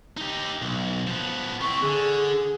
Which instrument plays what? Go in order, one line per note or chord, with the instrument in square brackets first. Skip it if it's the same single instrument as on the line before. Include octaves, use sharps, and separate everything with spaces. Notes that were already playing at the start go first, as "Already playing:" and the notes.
[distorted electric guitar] D#4 G4
B1
F3 B3
[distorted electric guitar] C4 E4 [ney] C#6
[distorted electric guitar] D3 [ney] G#4